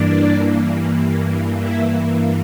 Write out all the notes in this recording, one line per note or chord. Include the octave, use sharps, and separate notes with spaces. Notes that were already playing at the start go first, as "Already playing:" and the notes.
Already playing: G2 E3 A#3 D4 D5
E4 E5